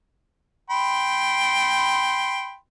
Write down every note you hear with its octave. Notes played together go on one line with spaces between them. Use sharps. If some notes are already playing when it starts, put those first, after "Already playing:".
G5 B5 C6